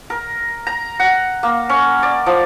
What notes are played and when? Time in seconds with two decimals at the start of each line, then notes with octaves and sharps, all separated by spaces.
0.10 A#4
0.67 A#5
0.99 F#5
1.43 A#3
1.69 C#4
2.03 D5
2.26 F3